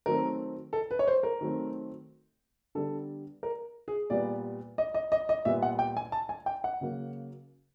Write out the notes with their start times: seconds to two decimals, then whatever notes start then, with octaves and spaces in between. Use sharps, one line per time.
0.06 D#3 F#3 A3 C4 A#4
0.73 A4
0.91 B4
0.99 C#5
1.07 C5
1.23 A#4
1.41 D#3 F#3 A3 C4
2.75 D3 G3 B3 A4
3.43 A#4
3.88 G#4
4.10 A#2 G3 B3 D5
4.78 D#5
4.94 D#5
5.12 D#5
5.29 D#5
5.45 A#2 G3 B3 E5
5.62 F#5
5.79 G5
5.97 G#5
6.12 A5
6.29 G#5
6.46 G5
6.64 F#5
6.81 C#3 F#3 A#3